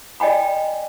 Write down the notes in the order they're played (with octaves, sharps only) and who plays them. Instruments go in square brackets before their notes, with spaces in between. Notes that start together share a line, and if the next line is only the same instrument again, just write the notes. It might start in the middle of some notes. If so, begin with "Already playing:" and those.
[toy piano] D5 D#5 G5 G#5 B5